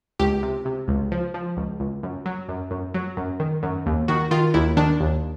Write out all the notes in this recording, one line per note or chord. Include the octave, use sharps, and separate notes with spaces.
C#2 G4
C3
C3
C#2
F3
F3
C#2
C#2
F#2
F#3
F#2
F#2
F#3
F#2
D#3
F#2
D#2
D#3 F#4
D#3 F4
D#2 E4
D#3 D4
D#2